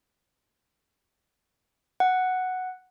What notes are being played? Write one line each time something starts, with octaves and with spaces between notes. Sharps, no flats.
F#5